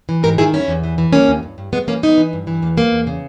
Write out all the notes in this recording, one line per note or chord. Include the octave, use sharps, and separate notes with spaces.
E3
G#2 G4 A#4
D#3 E4 G#4
E2 C#4 E4
E2
E3
E3
D#2 A#3 C#4
D#2
G2
G2
G2 G#3 B3
E3 A#3 C#4
E2 B3 D#4
E3
G2
E3
E2 A#3
B2 A#3
E2
C#3